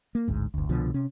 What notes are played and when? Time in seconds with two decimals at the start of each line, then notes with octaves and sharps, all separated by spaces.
0.15 A#3
0.28 A1 D2 G#2
0.54 G1 D2
0.69 C2 B2 D3 F3
0.94 C3 C#4